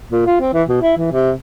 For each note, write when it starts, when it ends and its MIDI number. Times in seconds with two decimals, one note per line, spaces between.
0.12 0.23 46
0.26 0.37 65
0.40 0.52 60
0.53 0.63 52
0.68 0.80 47
0.82 0.95 64
0.97 1.10 52
1.13 1.33 48